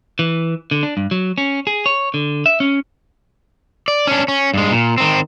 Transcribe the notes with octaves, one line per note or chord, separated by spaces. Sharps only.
E3
D3
D4
G2
F#3
C#4
G#4
C#5
D3
E5
C#4
D5
C#4 D4
C#4
G2 G#3
A#2
D#3 C4